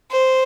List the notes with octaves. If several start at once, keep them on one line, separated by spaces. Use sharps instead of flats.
C5